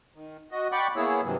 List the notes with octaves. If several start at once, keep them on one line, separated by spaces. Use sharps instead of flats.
D#3
F#4 D#5
D5 F#5 G5 B5 C#6 D6
A#3 B3 E4 G#4 C#5 E6
G2 C3 D#3 E3 F#3